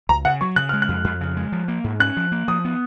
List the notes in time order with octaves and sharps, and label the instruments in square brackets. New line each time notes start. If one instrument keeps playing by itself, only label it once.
[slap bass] C#2 [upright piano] A#5
[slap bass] C#3 [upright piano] F#5
[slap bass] F#3 [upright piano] C#6
[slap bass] C#3 [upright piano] F#6
[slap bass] G#3 [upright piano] F6
[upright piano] F#6
[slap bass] F2
F2
C#3
G#3
F3
A#3
G#2
[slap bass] C#4 [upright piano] F#6
[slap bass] F3
A#3
[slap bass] F3 [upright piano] D#6
[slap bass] B3